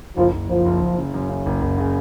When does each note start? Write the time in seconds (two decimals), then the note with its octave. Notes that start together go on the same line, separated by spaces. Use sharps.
0.17 F#1 F3
0.33 F#1
0.49 F#1 F3
0.66 F#1
0.81 F#1
0.98 C#3
1.14 F#2
1.29 C#3
1.46 F#1
1.62 F#1
1.78 C#3